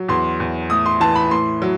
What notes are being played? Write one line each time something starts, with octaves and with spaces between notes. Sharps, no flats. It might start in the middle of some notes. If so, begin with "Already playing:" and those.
Already playing: F#3
E2 C6
E2
A2 D#6
C6
E3 A5
B5
A2 C6
F#3